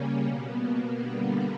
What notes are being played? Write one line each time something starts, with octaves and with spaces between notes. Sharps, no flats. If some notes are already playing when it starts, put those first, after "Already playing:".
Already playing: C#3 G3 A#3 C#4
B2 A#3 B3
A#3
D3 G3 A#3 B3